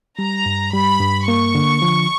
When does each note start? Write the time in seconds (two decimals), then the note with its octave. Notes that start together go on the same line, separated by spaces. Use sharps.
0.19 G3 A#5
0.46 G2
0.73 G3 B5
1.01 G2
1.28 A#3 C#6
1.55 D3
1.82 F3